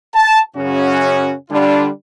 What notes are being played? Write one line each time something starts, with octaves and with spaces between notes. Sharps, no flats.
A5
F#2 C#3 C#4 F#4
D3 G3 D4 F4